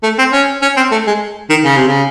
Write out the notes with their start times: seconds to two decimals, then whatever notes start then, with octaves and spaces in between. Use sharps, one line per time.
0.03 A3
0.18 C4
0.33 C#4
0.62 C#4
0.77 C4
0.91 A3
1.07 G#3
1.50 D#3
1.64 C#3
1.77 C3
1.88 C#3